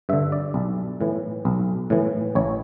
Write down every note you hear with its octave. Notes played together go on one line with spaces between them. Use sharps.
G2 D3 E5
D5
B1
A2 E3
B1
A2 E3
A1 C#5